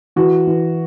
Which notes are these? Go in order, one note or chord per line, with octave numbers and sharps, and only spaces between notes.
E3 F#4
E3